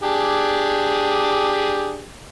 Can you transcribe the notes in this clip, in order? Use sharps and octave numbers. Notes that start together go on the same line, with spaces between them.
D4 G4 G#4